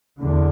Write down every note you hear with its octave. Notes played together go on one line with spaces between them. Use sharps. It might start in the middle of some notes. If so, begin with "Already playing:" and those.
E2 D3